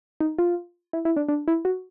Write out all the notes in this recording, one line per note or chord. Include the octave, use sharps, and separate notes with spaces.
D#4
F4
E4
E4
D4
D4
E4
F#4